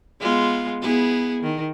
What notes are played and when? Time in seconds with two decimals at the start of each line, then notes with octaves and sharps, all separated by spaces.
0.20 G#3 B3 F4
0.82 B3 E4 G#4
1.43 D#3